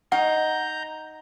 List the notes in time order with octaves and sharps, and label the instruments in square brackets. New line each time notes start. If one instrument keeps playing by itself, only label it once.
[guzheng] D#4 [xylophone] F#5 [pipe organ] A#5 G6